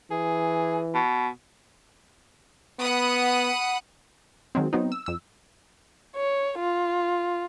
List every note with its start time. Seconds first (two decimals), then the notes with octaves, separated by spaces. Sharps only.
0.11 E3 G#4
0.94 B2
2.80 B3 F#5 B5 D#6
4.55 D#3 F#3 G#3 C4
4.73 F#3 B3 C4 D#4
4.92 E6
5.06 F2 E6
6.16 C#5
6.59 F4